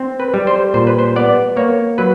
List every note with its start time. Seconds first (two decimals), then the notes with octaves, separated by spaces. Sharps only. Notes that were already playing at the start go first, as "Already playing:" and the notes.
Already playing: C4
0.20 B4
0.34 G3
0.47 C5
0.74 A#2 C5
0.87 B4
0.98 C5
1.16 B3 D5
1.57 A#3 C#5
1.98 F#3 B4